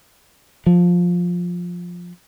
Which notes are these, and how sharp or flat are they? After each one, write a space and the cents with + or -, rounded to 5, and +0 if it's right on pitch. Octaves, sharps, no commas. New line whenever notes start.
F3 +10